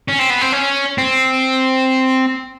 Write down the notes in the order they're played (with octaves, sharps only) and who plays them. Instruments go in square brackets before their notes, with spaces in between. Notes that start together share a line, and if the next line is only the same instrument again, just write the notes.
[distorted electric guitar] C#4
C4
B3
C4
C#4
C4